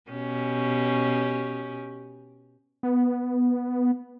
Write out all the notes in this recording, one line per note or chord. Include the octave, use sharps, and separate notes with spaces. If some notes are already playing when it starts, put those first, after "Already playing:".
B2 C#4 G4
B3